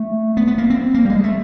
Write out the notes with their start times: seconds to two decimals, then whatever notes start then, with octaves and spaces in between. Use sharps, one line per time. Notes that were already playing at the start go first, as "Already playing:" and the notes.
Already playing: A3
0.37 B3
0.47 B3
0.58 A#3
0.70 C4
0.94 A#3
1.05 G3
1.10 G#3
1.24 A3